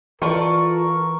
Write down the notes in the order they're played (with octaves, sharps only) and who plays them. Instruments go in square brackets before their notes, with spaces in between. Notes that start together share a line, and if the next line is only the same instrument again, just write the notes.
[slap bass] E3 [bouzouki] F4 A4 D5 [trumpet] A#4 [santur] C#6